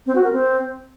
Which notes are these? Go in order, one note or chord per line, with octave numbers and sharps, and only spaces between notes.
C4
F#4
A#4
C4